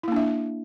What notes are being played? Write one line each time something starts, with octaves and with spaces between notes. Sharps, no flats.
A#3 D4 E4 E5